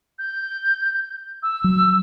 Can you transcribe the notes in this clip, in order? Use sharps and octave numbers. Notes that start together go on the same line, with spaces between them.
G6
E6
F#3